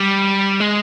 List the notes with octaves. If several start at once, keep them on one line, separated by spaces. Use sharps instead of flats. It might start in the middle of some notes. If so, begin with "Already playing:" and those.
Already playing: G3
G#3